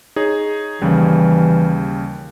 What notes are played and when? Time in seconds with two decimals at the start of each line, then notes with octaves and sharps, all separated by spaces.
0.16 D#4 G#4 C#5
0.81 D#2 C#3 E3 G3